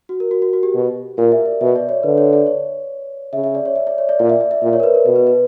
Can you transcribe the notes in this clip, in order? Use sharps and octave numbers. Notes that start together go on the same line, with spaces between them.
F#4
A#4
F#4
F#4
F#4
G4
B2
A#2 A#4
E5
D5
B2 E5
D5
C#5
D3 B4
C#5
D5
C#5
C#3 E5
E5
D5
C#5
E5
D5
C#5
D5
A#2 D5
E5
D5
E5
A#2
C#5
A#4
B4
A#4
B2 B4
B4
B4